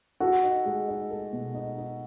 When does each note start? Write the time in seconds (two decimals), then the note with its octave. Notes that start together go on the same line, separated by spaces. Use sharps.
0.20 F#4 A4
0.43 D#4
0.65 G#3
0.88 D#4
1.11 A4
1.33 B2
1.55 D#4
1.78 D#4